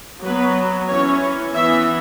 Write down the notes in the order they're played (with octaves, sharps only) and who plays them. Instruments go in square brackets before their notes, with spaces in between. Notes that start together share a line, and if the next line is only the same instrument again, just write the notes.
[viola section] F#3 B3 B4
E3 C#4 C#5
E3 B3 E5